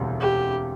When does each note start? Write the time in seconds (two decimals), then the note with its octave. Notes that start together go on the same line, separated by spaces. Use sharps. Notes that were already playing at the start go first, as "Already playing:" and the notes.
Already playing: E1 D2 C3 G3
0.21 G4